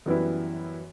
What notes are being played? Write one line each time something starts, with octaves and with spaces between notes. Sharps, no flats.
F#2 E3 G3 B3 E4